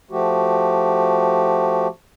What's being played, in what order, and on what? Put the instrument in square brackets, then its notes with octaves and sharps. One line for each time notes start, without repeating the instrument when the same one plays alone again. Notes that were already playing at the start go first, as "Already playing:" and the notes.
[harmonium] F3 A3 F#4 G4